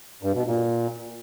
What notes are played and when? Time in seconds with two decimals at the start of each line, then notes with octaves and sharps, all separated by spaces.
0.23 G2
0.35 B2
0.46 A#2